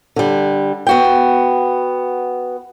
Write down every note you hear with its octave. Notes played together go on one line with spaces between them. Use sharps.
D3 G3
B3 F#4 G5